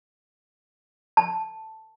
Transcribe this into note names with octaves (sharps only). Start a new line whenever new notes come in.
A5